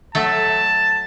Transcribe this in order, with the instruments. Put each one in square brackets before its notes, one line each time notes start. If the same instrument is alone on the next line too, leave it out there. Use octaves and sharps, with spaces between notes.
[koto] F#3 A3 [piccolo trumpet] A5